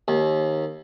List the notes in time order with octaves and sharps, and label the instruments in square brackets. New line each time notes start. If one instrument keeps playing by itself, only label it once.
[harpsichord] D#2